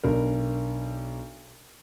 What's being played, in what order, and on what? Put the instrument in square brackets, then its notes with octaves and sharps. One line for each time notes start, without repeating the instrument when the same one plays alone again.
[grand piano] B1 D4 A#4